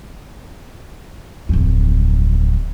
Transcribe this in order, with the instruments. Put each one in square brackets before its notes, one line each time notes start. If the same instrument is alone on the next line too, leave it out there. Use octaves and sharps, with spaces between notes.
[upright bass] D1 F2